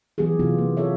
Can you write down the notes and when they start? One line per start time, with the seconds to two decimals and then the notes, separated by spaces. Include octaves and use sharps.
0.18 E3 F#3 B3 G4 G#4
0.39 C3 E3 B3 E4 F4 G4
0.58 A#3
0.77 F4 G#4 A4 C#5 E5